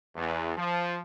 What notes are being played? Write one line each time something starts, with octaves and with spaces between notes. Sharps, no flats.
E2
F3